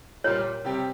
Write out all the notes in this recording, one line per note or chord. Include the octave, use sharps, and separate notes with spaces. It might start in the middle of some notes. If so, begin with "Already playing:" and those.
A#2 G3 A#3 F4 C#5
C3 G3 C4 G4